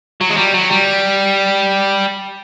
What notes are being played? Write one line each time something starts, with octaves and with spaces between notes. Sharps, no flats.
F#3
G#3
G3
F#3
G3